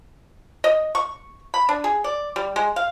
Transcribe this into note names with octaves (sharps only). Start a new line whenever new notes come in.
D#5
C#6
B5
D4
G#4
D5
G3
G#3
F5